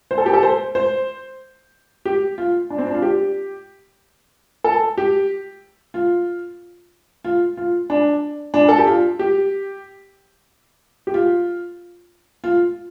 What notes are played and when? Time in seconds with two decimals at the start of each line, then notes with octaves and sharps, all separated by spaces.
0.11 C5
0.18 A4
0.26 G4
0.33 A4
0.43 C5
0.75 C5
2.05 G4
2.38 F4
2.70 D4
2.78 C4
2.87 D4
2.94 F4
3.02 G4
4.64 A4
4.98 G4
5.94 F4
7.25 F4
7.57 F4
7.90 D4
8.54 D4
8.69 A4
8.78 G4
8.87 F4
9.19 G4
11.07 G4
11.14 F4
12.44 F4